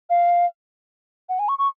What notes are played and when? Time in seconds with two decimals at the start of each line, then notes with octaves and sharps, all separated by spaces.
0.10 F5
1.29 F#5
1.39 G#5
1.49 C#6
1.59 C#6